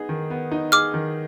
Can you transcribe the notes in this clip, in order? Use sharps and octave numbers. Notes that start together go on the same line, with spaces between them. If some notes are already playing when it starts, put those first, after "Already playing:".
Already playing: B3 D#4 G#4
D#3
B3
D#4
G#4 D6 F6
D#3